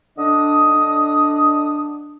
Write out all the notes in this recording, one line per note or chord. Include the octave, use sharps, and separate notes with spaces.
D3 D4 D#5 D#6
D4